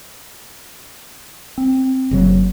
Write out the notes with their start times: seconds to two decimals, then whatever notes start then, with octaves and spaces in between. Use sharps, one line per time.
1.58 C4
2.11 F#1 C#3 F#3